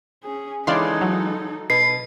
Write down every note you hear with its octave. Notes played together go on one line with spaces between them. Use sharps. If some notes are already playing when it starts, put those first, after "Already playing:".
C#4 G#4
E3 G#3 C#4 D#4 A4 D5 F5 C6
F#3
B2 B4 C7